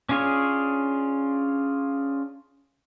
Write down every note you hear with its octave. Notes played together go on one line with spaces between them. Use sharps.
C#4 D4 F4 G#4 C#5